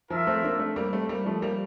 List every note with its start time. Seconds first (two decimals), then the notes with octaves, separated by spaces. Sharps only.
0.10 F3 F4 A#4 E5
0.27 A3 C4
0.43 A#3 D4
0.59 A3 C4
0.76 G3 A#3
0.93 A3 C4
1.09 G3 A#3
1.26 F3 A3
1.42 G3 A#3